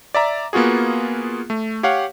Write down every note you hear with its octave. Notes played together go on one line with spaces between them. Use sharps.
D5 E5 A#5
A#3 B3 F4 F#4 G#4
A3
G4 C#5 F5 F#5